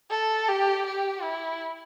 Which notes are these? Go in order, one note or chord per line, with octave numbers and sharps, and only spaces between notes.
A4
G4
G4
E4